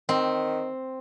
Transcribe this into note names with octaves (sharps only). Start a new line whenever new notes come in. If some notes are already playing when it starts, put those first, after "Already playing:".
D#3 C4